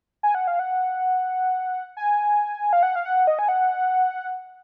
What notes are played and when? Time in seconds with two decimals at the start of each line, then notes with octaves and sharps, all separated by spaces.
0.23 G#5
0.35 F#5
0.47 F5
0.59 F#5
1.97 G#5
2.73 F5
2.83 F#5
2.96 F5
3.05 F#5
3.27 D#5
3.39 G#5
3.48 F#5